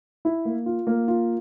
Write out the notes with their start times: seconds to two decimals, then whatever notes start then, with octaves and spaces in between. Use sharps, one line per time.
0.25 E4
0.45 A#3
0.66 F4
0.87 A#3
1.08 F4